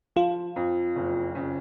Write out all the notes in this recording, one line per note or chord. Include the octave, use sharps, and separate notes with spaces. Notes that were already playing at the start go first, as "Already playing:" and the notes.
F3 F4
F2
F#1
C#3